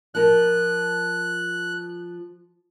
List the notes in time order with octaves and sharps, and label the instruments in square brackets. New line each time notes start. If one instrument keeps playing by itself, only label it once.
[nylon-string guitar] F3 A#4 [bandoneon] F#6